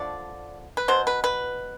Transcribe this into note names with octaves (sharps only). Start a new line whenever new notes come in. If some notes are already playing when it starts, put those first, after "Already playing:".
Already playing: D3 F3 A3 D5
B4
B2 F#3 C5
B4
B4